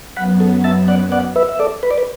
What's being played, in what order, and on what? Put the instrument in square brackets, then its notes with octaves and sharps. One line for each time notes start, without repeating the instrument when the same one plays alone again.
[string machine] F#2 F#3 B3 [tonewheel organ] F#5 B5
[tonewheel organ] A4
E5 A5
D5 F#5
D5 F#5
B4 E5
E5
A4 D5
B4
D5
B4